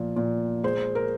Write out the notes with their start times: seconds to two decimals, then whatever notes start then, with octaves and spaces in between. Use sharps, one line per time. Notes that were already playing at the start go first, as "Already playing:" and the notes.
Already playing: A#2 F3
0.16 A#2
0.63 G#3 C5
0.95 A#4